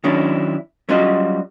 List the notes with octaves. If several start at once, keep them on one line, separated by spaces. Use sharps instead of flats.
D#3 F#3 C#4 D4 E4
F#3 G3 C#4 F4 F#4 D#5